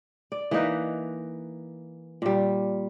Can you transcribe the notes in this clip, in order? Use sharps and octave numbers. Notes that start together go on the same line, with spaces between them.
D5
E3 A#3 D#4 B4
A#2 G3